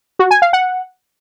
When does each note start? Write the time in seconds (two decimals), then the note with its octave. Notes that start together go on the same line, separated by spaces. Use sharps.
0.19 F#4
0.31 G#5
0.42 F5
0.53 F#5